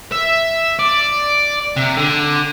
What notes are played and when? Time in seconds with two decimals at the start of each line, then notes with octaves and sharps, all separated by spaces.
0.12 E5
0.79 D5
1.76 C3
1.97 D3